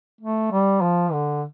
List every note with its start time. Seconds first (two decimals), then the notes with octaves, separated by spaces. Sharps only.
0.21 A3
0.52 G3
0.82 F3
1.12 D3